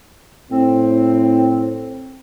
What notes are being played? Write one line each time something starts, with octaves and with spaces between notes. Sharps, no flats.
A2 C4